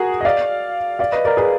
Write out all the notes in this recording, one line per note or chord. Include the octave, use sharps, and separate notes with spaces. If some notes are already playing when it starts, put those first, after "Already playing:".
Already playing: F#4 G#4 A#4
D#5
D5 F5
D5 F5
B4 D#5
A#4 D5
G#4 B4